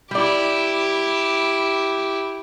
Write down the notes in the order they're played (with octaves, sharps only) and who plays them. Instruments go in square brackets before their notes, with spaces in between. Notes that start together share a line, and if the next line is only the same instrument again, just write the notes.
[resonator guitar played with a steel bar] G3 D5 [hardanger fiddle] E4 G4